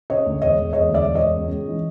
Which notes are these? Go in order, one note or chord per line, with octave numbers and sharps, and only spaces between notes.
C#3 C#5 D#5
D2
E1 C#5 D#5
E1
E1 C#5 D#5
D2
D5 E5
E1
C#5 D#5
E1
C#2
C#2
E3